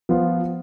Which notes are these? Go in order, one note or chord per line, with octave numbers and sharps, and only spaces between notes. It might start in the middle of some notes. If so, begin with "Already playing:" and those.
F3 B3 F4